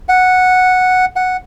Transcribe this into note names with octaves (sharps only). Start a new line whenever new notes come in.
F#5
F#5